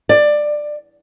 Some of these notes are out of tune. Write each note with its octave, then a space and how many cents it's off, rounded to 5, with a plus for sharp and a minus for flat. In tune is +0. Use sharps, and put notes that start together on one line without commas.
D5 +15